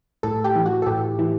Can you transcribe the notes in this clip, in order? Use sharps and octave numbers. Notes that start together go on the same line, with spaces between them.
A2 A4
G4
E3
F#4
A4
A2 G4
E3